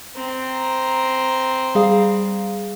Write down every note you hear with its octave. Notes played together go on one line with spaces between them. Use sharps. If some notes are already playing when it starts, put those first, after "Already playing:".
C4 A#5
G3 G#4 F5